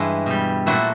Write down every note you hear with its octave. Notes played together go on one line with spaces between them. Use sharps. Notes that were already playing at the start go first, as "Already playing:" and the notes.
Already playing: G2 E3 G#3
B2 G3
A#2 F#3 A3 E4 F#4